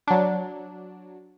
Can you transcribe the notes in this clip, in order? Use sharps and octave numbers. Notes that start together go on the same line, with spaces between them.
F#3 D4